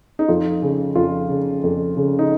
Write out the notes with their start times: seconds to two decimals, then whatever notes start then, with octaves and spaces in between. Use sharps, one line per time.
0.19 D#4
0.28 F2 F4
0.62 C#3
0.95 F2 F4
1.29 C#3
1.63 F2
1.97 C#3
2.19 D#4